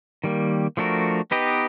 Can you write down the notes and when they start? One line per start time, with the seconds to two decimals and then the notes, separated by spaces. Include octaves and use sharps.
0.24 D#3 G3 A#3
0.77 F3 A3 D4 F#4 A#4
1.31 B3 D#4 G4 B4 D#5